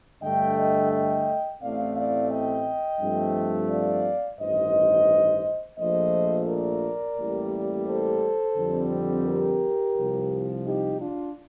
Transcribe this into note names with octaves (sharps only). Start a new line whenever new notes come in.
G2 D3 A3 D#5 G5
D#5 G5
D#5 G5
A1 A2 A3 C4 D5 F5
D5 F5
D#5 G5
G2 F3 A3 C4
D5 F5
A1 G2 D#3 C5 D#5
A#1 A#2 F3 A3 C5 D#5
A#4 D5
A1 A2 G3 A#3
A4 C5
F2 D3 G3 C4
G4 A#4
C2 C3 F3
D#4 G4
D4 F4